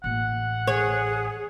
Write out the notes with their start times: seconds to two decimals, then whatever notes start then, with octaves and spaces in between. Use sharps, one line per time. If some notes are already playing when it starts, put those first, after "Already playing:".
0.04 A1 A#3 F#5
0.67 G#4 C#5